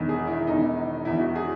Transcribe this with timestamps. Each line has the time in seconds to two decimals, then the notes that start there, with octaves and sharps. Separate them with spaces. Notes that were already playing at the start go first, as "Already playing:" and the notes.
Already playing: E1 E2 D#3
0.09 G#4
0.27 E4
0.47 E1 E2 D#3 D#4
1.05 E1 E2 D#3 E4
1.20 F#4
1.35 G#4